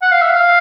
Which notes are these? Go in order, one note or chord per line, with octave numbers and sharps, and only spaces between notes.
F#5
F5
E5
F5